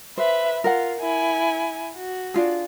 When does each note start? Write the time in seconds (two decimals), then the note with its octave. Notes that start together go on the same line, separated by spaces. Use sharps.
0.18 B4 C5 E5
0.64 F4 A#4 F#5
1.00 E4 G#5
1.97 F#4
2.34 D4 F4 G#4